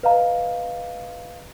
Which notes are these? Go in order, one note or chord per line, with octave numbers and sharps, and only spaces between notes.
B4 D#5 F5 A#5